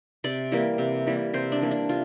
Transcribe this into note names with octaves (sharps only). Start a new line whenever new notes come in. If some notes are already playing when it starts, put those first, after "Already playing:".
C3 D5
E3 G3 A#3
C3
E3 G3 A#3
C3 C5
D4
E3 G3 A#3
D4
C3 F4